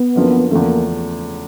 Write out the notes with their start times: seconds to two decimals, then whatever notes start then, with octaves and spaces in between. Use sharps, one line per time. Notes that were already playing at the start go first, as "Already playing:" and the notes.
Already playing: B3
0.16 F#2 D3 F3 A#3
0.50 E2 C#3 F3 A3 A#3